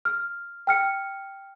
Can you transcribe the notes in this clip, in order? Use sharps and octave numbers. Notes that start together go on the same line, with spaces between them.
F6
G5 F6 C#7